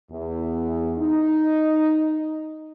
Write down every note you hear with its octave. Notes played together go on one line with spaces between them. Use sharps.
E2
D#4